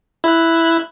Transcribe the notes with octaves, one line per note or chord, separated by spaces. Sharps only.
E4 F#6